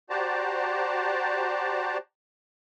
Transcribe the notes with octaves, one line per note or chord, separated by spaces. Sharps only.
F#4 G4 C5 D5 A5 A#5